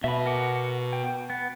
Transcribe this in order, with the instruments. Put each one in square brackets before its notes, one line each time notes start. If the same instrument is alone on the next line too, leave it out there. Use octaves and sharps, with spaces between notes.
[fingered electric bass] B2 [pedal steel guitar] E5 B5
[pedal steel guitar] A#4 F#5 D6
G5
B3